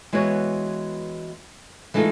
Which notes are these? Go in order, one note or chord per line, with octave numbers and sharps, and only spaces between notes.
E3 G#3 B3 F#4 C#5
E3 G#3 A3 D#4 F4 A4